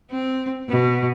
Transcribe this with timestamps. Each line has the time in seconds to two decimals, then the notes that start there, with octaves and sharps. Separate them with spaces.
0.11 C4
0.69 B2